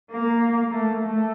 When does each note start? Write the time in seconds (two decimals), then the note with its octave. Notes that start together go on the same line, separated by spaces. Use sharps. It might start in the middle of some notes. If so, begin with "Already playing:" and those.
0.11 A#3
0.71 A3
1.02 A3